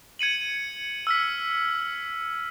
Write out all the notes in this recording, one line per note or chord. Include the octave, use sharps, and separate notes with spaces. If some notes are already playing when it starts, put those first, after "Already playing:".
G#6 C#7 D#7 F#7
E6 F6 B6